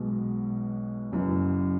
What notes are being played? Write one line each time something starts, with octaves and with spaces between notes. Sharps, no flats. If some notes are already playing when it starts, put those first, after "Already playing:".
Already playing: B1 B2 G#3 B3
F#1 F#2 E3